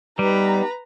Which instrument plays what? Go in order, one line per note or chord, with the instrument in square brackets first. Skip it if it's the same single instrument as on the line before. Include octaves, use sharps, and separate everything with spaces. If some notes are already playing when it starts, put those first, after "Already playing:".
[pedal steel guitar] G3 [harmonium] B3 D#4 G4 [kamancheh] B4 A#5